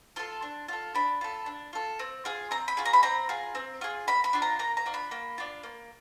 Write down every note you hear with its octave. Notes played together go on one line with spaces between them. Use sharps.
F4 A4 C6
D4
F4 A4
D4 B5
F4 A4
D4
F4 A4
C4
F4 G#4
C4 A#5
B5
F4 G#4
A#5
B5
C4 A#5
F4 G#4
C4
F4 G#4
A#3 B5
B5
D4 F4
A#5
A#3 A#5
A#5
D4 F4
B5
A#3
D4 F4
A#3